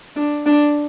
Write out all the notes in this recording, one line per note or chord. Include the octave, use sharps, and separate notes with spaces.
D4
D4